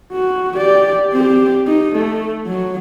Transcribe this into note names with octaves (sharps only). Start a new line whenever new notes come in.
F#4
G4 D5
C4 G4
D#4
A3
F#3